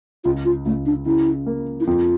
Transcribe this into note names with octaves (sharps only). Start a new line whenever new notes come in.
C#2 F4
F4
C#2 A3
D4
C#3 E4
A#3
E4
F2 F4